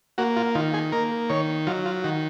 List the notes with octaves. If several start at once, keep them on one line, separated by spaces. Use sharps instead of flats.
A#3 F#4
F4
D#3 F4
G#4
A#3 A#4
D#3 C#5
F#3 F4
F4
D#3 F#4